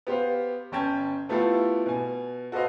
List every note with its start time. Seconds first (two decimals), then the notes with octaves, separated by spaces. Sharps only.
0.07 B3 G4 C5 F5
0.72 G1 C#4 G5 A5 G6 G#6
1.29 A3 B3 E4 F4 G4 A4
1.86 B2 G#5
2.52 F#4 A4 B4 C5 D#5 F5